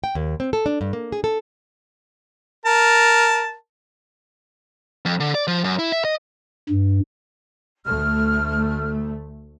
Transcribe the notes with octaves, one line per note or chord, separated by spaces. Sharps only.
G5
D#2
C4
A4
D4
G2
A#3
G#4
A4
A#4 A5
F2
D3
D5
F3
F#2
E4
E5
D#5
G2
D2 A3 F6